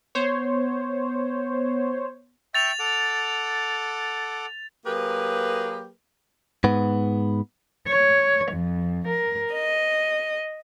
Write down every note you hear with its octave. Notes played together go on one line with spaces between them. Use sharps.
B3 C5 C#5
E5 G5 C#6 A6 F7
A4 F#5 D6
F#3 A#3 G4 G#4 A#4 B4
G#2 B3
C#5
F2
A#4
D#5